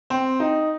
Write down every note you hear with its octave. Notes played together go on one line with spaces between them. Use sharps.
C4
D#4